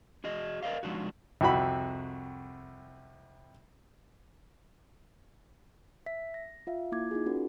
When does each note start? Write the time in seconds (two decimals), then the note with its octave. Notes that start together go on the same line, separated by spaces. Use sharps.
0.24 F#4 G#4 D#5
0.63 A#4 D5 D#5 F5
0.83 F3 G#3 D4 D#4 F#4
1.41 C2 F2 F#4 B5
6.06 E5 B6
6.34 A#6
6.67 F4 E5 F5
6.92 A#3 E4 F4 D6 G#6
7.11 D#4 F4 G#4
7.26 C#4 D#4 F#4 A#4